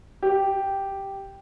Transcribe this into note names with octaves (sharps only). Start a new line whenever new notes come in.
G4